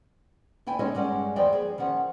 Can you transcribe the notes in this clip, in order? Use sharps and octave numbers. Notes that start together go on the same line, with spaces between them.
D2 E4 G5 G#5
G#3 C#4 D#4 A4 C#5 D#5
G2 G3 G#3 C#4 F#5 G#5
D#2 E3 F3 D5 D#5 G5
G#4
D#3 F3 C#4 F#5